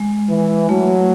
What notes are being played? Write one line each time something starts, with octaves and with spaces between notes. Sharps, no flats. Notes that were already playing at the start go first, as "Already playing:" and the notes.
Already playing: G#3
E3
F#3 A3